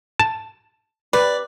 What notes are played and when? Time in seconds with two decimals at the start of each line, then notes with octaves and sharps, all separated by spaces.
0.19 A5
1.13 C3 B4 D5